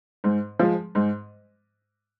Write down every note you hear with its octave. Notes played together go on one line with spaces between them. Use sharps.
G#2
F3 G#3
G#2